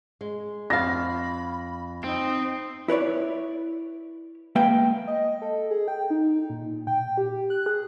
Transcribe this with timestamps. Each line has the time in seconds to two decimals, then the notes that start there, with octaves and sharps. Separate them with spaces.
0.21 G#3
0.70 F2 F5 B5 A#6
2.04 C4 D#4
2.88 E4 B4 C#5 D5
4.56 G#3 A#3 B4 E5 G5
5.07 D#5
5.42 A4
5.71 G#4
5.88 G5
6.10 D#4
6.50 A#2
6.87 G5
7.17 G4
7.50 F#6
7.66 G#4